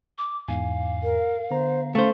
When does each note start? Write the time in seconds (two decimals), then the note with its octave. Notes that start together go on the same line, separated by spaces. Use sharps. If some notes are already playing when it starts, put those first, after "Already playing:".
0.18 D6
0.48 E2 G#2 F5 G#5
1.04 A#4
1.51 D3 B3 C5 A#5
1.95 A3 C#4 C5 F5